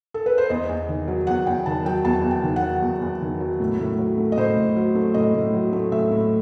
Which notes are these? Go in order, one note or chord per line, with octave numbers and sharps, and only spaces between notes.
A4
B4
C5
E2 D#5
E2
D#3
F#3
E2 F#5
E2 G5
D#3 A5
F#3 G5
E2 A5
E2
G5
D#3
F#5
F#3
E2
E2
D#3
F#3
A2
A2
F#3
A3
D#5
A2 C5
A2
F#3
A3
A2 D#5
A2
F#3
A3
A2 E5
A2